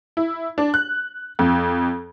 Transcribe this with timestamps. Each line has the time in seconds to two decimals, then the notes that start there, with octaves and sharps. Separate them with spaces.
0.17 E4
0.58 D4
0.74 F#6
1.39 F2